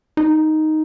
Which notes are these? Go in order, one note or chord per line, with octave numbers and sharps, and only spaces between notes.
D#4